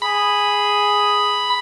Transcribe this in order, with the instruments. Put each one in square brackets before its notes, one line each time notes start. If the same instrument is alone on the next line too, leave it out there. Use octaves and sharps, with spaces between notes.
[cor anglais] G#4 [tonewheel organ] B5